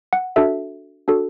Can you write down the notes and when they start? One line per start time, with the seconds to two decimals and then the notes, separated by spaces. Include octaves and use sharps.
0.13 F#5
0.36 D4 F#4 A4 E5
1.08 D4 F#4 A4